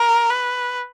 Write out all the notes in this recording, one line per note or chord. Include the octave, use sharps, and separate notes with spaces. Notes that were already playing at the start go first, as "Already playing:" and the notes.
Already playing: A#4
B4